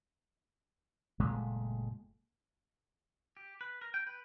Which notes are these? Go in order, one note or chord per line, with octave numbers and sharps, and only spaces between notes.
F#1 A#2 G#3 A3
G4
B4
A#4
G5
B4